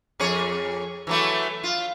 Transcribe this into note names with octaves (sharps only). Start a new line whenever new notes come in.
F2 G#4 C#5
E3 F#3 A3
F4